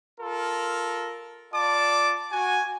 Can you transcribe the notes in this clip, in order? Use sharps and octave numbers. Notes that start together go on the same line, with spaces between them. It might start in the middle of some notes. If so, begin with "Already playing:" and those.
F4 A4 A#4
F4 D5 A5 D6
F#4 G#5